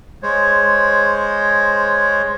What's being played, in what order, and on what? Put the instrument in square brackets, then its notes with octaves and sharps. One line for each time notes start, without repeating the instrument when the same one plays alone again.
[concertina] G#3 C5 C#5